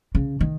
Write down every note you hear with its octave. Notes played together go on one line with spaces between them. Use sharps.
C#3
D#3